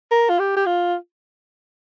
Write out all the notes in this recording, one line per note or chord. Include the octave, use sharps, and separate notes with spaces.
A#4
F4
G4
G4
F4